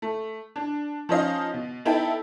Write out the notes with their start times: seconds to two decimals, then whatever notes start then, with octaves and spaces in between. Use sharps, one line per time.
0.02 A3
0.56 D4
1.09 F3 C#4 D#4 D#5 F5
1.54 B2
1.85 B3 D#4 E4 A4 G5 A5